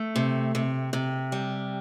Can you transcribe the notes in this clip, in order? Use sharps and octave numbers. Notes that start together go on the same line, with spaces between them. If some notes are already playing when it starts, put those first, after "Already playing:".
Already playing: A3
C3
C3
C3
G3